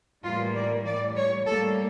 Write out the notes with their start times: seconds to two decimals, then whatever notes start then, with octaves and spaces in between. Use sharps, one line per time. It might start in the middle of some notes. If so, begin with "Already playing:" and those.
0.24 A2 E3 G3 A#3 F4
0.55 D5
0.86 A2 E3 G3 D5
1.16 C#5
1.46 A2 G3 A#3 A4